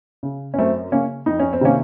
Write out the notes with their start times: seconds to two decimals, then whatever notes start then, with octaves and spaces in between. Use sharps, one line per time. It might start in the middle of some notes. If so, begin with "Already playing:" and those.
0.23 C#3
0.54 C#4
0.59 F#2 A3 C4
0.92 C#3 A#3 C#4
1.26 F2 D#4
1.40 C#4
1.53 C4
1.61 C3 D#3 A#3 C#4